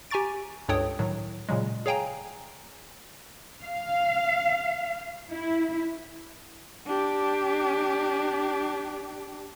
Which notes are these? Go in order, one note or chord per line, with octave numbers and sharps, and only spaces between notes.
G4 G#5 A#5 C#6 A6 D7
C#2 G2 A4 C#5 G5 D#6
A2 D#3 F#3
A#2 C#3 F#3 G#3
G#4 C#5 F5 G5 G#5 A#5
F5
E4
D4 G4